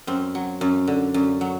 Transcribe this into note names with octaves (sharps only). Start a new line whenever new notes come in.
F#2 C4
F#3
F#2
D3
F#2
F#3